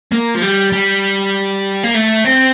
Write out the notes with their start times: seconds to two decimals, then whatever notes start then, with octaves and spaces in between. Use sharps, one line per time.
0.12 A#3
0.35 F3
0.42 G3
0.73 G3
1.83 A#3
1.94 A3
2.24 C4